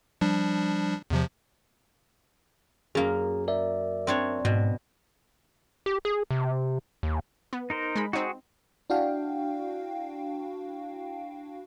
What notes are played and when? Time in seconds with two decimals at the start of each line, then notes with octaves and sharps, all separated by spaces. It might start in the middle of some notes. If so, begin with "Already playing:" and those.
0.21 F3 G3 D4
1.10 E2 C3 F3
2.95 F#2 A#3 G#4
3.48 A#4 D5 E5
4.07 C4 D4 C#5
4.45 G#2 B2
5.86 G4
6.05 G#4
6.31 C3
7.03 D#2
7.53 B3
7.70 D#4 A#4 C5
7.96 G#3 B5
8.13 C4 D#4 F#4 G#4
8.90 D4 E4 F#4 F5 G5